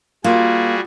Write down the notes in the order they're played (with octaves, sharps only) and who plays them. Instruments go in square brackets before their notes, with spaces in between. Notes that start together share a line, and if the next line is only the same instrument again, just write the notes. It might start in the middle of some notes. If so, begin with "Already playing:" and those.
[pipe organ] G3 F#4 G#4 [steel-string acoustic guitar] A#3 [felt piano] F4